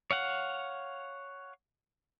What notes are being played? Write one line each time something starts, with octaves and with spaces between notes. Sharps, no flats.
C#5 F5 F#5